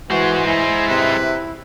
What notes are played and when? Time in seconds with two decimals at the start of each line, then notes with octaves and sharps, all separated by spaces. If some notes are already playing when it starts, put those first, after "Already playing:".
0.10 E3 G#3 F#4 C5
0.46 E4 A#5
0.88 C3 B4